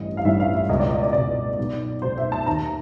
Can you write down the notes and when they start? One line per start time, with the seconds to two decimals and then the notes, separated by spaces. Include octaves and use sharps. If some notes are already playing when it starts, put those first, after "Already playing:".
Already playing: A1 G2 E3 D#5
0.17 F5
0.25 A1 G2 E3 E5
0.40 F5
0.55 E5
0.69 C#2 D#5
0.73 B2
0.80 D5
0.91 D#5
1.03 D5
1.13 C#2 D5
1.18 B2
1.58 B1 B2
2.02 B1 B2 C5
2.18 E5
2.32 A5
2.46 D#2 D#3 A#5